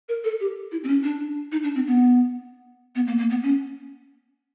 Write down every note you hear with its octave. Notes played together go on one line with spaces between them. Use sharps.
A#4
A4
G4
E4
C4
C#4
D4
D#4
D4
C4
B3
B3
A#3
A#3
B3
C#4